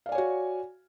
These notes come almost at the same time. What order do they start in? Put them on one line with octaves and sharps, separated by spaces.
F5 D5 G#5 C#5 F#4